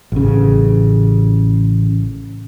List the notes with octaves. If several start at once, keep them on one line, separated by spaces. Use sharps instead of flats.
A1 C#3